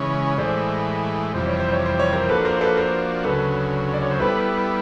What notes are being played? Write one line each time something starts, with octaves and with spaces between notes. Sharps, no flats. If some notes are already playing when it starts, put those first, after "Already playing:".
Already playing: C#3 E3 G#3 C#4
A2 E3 G#3 C5 D5
F2 C3 E3 G3 C5
C#5
C5
C#5
C5
C#5
A#4 C5
F3 A#3 D4 F#4 A4 B4
A#4 C5
C5
A4 B4
A#4 C5
D2 C#3 F#3 A4 B4
D5
C#5
C5
G3 B3 E4 A4 B4